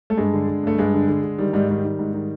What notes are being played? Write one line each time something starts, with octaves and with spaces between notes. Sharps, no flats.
A3
G2 G#3
D3
D3
G2 A3
G2 G#3
D3
D3
D3
D#3 G3
G#2 G3
D#3 G3
D#3
G#2
D#3